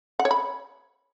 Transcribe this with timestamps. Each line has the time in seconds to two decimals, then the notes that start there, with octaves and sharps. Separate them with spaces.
0.19 F#5
0.25 C#5
0.31 B5